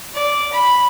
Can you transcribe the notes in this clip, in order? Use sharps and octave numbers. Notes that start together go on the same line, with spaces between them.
D5
B5